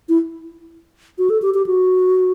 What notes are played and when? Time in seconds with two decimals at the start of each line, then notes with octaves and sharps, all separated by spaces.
0.09 E4
1.18 F#4
1.30 A4
1.42 G4
1.54 G4
1.66 F#4